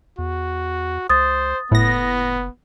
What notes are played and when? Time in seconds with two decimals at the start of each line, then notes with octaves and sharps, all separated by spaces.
0.18 E2 F#4
1.10 C#2 C5 D#6 A6
1.71 F#1 A2 B3 A#6